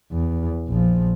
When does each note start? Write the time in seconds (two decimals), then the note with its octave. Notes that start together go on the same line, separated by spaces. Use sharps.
0.12 E2
0.68 A#1 F3